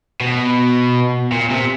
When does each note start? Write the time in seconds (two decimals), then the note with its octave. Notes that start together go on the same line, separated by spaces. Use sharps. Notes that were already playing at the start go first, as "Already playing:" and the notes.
0.21 B2
1.32 A#2
1.50 C3